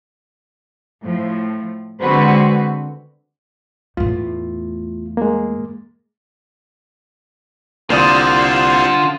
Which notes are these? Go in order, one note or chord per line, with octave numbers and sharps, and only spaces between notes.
A2 F3
D3 G#3 C4 F#4 B4 C5
E2 A2 F4
G#3 A#3
C2 D3 A#3 F4 C5 D5 D#6